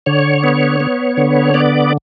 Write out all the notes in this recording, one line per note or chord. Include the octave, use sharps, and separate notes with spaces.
D3 C#5
B3
B3
D3
B3 D5